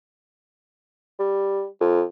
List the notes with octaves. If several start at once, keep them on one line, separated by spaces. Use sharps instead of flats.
G3
F2